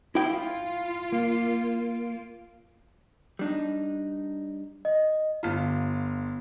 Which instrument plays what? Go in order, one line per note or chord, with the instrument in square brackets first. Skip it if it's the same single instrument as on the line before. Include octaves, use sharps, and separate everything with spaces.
[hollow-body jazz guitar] E4 G5 [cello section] F4
[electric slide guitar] A#3
[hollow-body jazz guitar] G3 D4 D#4
[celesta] D#5
[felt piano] G1 F4